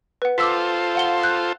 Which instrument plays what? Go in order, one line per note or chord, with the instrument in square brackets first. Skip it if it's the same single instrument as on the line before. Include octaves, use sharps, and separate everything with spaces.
[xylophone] B4 F#5
[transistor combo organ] F4 A4 C5 [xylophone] D6 E6 B6
[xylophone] F5 F#5 G7
F#6 G6